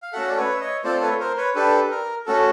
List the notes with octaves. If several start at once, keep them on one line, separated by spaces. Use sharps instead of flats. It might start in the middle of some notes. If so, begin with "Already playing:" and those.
F5
A3 C#4 F#4 A4 E5 F#5
D5
B4 C#5
E5
C#5 D#5
A3 C4 F4 A4 C5 D5
B4 C#5
A#4 C5
B4 C#5
D4 G4 A4 B4
A#4
A3 C#4 F#4 A4